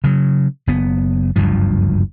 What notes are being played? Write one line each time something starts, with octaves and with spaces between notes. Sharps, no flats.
C#3 F#3
F#1 B3
F#1 D2 G2 F3